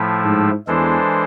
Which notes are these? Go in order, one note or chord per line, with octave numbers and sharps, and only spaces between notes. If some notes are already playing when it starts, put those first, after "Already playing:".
Already playing: A2 F3 A3 E4
G#2
E2 E3 G#3 D4 A4 C5